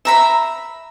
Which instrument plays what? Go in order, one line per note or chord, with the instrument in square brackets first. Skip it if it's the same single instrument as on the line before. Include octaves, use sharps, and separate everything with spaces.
[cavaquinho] E5 A#5 B5